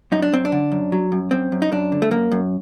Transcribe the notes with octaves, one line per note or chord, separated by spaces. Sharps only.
F#2 D#4
D4
F#2 C4
D4
D3
F#2
F#3
F#2
F#2 C4
F#2
D#4
F#2 D4
D3
A3
F#2 A#3
F#2